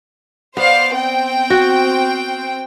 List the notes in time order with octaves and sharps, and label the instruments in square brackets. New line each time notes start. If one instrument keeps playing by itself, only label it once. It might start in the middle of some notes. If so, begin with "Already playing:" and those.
[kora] B3 [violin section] C5 D5 F5
[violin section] C4 G5
[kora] F#4